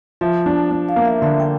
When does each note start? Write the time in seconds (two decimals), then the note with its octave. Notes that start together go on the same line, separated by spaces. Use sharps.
0.21 F3 E5
0.46 D4
0.71 D4
0.89 F5
0.96 A#3
1.05 E5
1.22 D3 E5
1.40 G5